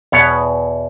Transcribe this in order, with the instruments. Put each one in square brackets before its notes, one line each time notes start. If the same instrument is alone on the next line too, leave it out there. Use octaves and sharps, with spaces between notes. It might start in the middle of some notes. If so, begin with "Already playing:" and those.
[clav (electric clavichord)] E2 B2 B3 C#5 F#5